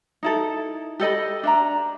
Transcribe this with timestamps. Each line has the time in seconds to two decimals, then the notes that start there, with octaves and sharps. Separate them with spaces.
0.23 D#4 E4 A4
1.00 G4 A4 D#5 B5
1.43 D4 E5 A#5